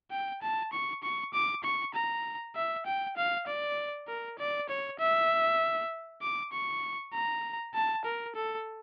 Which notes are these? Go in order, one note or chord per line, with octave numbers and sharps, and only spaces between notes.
G5
A5
C#6
C#6
D6
C#6
A#5
E5
G5
F5
D5
A#4
D5
C#5
E5
D6
C#6
A#5
A5
A#4
A4